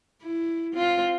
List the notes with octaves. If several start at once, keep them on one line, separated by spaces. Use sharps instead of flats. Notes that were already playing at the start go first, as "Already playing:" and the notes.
E4
C4 F4